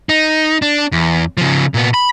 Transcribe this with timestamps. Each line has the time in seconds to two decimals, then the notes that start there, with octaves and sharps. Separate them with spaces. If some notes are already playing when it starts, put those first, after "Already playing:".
0.09 D#4
0.62 D4
0.92 E2
1.37 C#3 F3
1.74 A#2 B3
1.94 B5